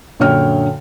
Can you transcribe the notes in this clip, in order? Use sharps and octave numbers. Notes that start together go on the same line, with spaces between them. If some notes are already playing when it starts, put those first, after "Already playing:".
A#1 F#2 D3 C#5 G5 F6